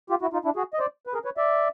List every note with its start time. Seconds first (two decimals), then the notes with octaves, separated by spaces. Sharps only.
0.10 F4 G4
0.21 E4 F#4
0.33 D#4 F4
0.45 D4 E4
0.56 F#4 G#4
0.74 D#5
0.79 C5 D5
1.07 B4
1.13 G#4 A#4
1.25 B4 C#5
1.37 D5 E5